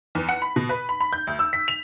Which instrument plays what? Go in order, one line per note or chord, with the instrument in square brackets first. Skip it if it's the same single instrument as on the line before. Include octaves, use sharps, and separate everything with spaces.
[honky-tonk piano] E2
F#5
B5
B2
B4
B5
B5
G6
D2
E6
B6
F7